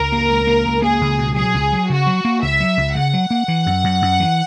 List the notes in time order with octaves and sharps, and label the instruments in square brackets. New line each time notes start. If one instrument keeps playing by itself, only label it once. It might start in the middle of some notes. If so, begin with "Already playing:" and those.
Already playing: [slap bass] C#2 [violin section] A#4
[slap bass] A#3
C#2
A#3
C#2
[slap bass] A#3 [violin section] G#4
[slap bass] C#2
B2
[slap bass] F#3 [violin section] G#4
[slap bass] C#2
F#3
[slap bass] C#3 [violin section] F#4
[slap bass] F#3
A#3
[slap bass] C#2 [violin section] E5
[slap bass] F#3
C#2
[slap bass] C#3 [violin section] F#5
[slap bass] F#3
A#3
E3
F#2
F#2
F#2
E3